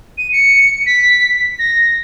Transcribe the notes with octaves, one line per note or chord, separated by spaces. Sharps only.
D#7
C#7
B6
A#6